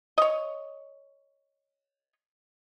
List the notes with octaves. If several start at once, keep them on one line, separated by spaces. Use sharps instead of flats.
C#5 D#5